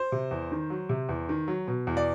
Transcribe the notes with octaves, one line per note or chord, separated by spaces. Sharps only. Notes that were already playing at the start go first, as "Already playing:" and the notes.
Already playing: C5
C3
E2
D#3
F#3
C3
E2
D#3
F#3
B2
E2
D5